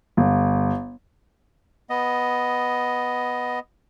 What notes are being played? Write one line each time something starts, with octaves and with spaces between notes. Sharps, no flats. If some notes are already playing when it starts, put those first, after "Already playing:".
G1
B3 D#5